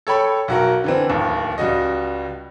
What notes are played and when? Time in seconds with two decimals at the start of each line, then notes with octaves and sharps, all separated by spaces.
0.07 A4 C#5 G5 B5
0.48 B1 F#4 A#4
0.84 D3 E3 C4
1.10 D1 D#2
1.58 C#2 G3 F#4 D#5